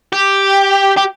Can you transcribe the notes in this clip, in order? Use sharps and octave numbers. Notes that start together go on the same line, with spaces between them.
G4
G4